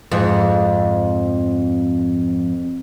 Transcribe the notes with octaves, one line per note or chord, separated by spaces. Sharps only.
F2 G#2